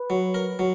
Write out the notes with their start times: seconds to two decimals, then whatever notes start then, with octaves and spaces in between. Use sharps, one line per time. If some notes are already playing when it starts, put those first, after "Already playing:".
Already playing: B4
0.10 F#3
0.34 A#4
0.59 F#3